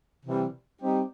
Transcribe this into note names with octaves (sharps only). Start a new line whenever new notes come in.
C3 E3 G3
G3 C4 D#4 G4